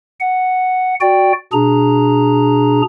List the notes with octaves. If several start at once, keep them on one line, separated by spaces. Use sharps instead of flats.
F#5
F#4 D5 G5
B2 D4 G#4 A#5